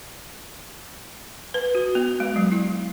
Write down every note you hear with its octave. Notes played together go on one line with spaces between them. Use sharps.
B4
F#4
B3
G#3
F#3
E4